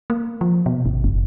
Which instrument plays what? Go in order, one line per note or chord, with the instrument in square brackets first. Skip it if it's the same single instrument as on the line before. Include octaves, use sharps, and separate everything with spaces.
[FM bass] A#3
F3
B2
G#1
F#1